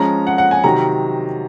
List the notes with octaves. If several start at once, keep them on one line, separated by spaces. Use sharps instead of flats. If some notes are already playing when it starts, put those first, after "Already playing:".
Already playing: F3 G#3 C#4 A#5
F#5
F#5
G#5
C3 D#3 F#3 A#5